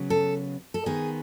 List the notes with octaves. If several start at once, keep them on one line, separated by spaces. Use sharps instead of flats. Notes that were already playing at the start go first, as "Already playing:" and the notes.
Already playing: C#3 F#3 B3
A4
A4
D#3 G#3 B3 G#4